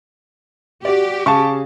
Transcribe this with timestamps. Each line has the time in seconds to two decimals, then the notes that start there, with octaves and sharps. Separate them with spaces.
0.85 F#4 G4 D5
1.26 C#3 G#4 F5 A5 C#6